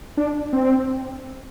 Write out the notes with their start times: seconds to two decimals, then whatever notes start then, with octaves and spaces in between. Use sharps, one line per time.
0.17 D4
0.53 C4